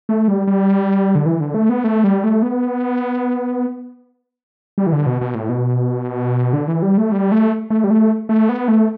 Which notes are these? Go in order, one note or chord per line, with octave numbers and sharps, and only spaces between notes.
A3
G3
G3
D3
E3
D3
A3
B3
A3
G3
A3
B3
G3
E3
D3
B2
B2
A2
B2
D3
E3
G3
A3
G3
A3
A3
G3
A3
A3
B3
A3